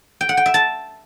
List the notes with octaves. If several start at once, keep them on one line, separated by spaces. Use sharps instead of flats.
G5
F#5
G5
E5
A5